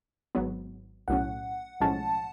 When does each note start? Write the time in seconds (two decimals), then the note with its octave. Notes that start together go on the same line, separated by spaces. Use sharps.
0.35 G#1 G#2 F#3 B3
1.08 B1 A2 F#3 C#4 F#5
1.81 B1 A2 F3 G#3 C#4 A5